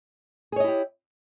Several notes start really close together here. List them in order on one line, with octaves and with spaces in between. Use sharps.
G#4 C#5 D#5 E4 G4